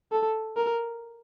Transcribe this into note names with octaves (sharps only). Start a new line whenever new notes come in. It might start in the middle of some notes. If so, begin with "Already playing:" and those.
A4
A#4